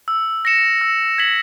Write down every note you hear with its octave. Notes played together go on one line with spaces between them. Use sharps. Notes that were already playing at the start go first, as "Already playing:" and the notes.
E6
A#6 C#7 E7
E6
G#6 B6 F#7